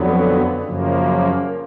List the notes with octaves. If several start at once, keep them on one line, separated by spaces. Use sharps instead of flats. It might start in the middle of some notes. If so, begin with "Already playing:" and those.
Already playing: F2 D3 F#3 B3
F#2 C#3 F3 A#3